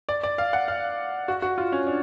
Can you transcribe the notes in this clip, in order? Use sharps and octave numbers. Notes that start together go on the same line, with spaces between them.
D5
D5
F5
F#5
F5
F#4
F#4
F4
C#4
D4